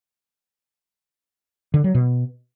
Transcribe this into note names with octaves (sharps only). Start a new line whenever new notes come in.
D3
F#3
B2